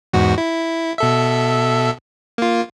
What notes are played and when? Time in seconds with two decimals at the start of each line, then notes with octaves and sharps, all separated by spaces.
0.13 E2 G#2 F#4
0.38 E4
0.98 B2 A4 E5
2.38 A#3 F4